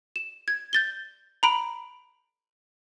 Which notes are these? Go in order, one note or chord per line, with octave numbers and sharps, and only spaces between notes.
E7
G#6
G6 A6 G7
A#5 B5 D7